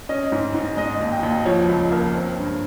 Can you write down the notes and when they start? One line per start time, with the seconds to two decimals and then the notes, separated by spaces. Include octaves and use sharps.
0.09 C#4 D#5
0.32 G#2
0.55 G#2
0.77 G#3 D#5
1.00 D#2
1.12 G5
1.23 D#2
1.45 F3 C#5
1.68 C#2
1.92 A#3
2.15 C4
2.37 G2